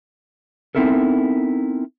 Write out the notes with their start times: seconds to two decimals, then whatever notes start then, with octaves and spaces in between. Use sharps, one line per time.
0.75 B3 C4 D#4 E4 A4 A#4